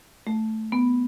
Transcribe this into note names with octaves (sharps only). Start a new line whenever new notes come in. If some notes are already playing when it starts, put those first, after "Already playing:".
A3
B3